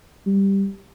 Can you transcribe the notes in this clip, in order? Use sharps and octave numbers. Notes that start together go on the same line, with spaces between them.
G3